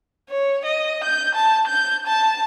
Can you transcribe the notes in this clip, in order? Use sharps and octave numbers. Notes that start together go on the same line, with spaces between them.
C#5
D#5
G6
A5
G6
A5